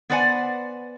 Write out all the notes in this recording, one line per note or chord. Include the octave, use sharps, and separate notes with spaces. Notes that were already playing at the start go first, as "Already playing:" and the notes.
B3 B4 C5 D5 F#5 G#5